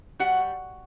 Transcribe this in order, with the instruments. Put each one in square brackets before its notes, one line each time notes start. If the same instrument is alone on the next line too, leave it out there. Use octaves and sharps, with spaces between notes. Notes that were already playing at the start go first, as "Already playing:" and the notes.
[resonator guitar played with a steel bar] G3 F#4 F#5